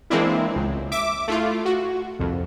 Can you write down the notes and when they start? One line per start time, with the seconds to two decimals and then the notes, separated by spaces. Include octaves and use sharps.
0.10 E3 G#3 A#3 C4 D4 E4
0.56 C#2
0.92 E5 D6
1.28 A3 E4 F4
1.65 F#4
2.19 C2 F2